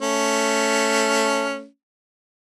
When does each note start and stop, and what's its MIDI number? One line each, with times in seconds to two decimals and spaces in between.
0.01 1.65 57
0.01 1.65 61